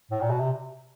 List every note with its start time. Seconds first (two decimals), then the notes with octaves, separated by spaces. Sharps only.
0.11 A2
0.21 A#2
0.30 B2
0.40 C3